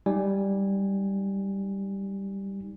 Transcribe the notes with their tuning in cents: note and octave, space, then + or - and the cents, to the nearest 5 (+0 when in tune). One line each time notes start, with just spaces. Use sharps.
G3 +0 D#4 +10 G#5 -15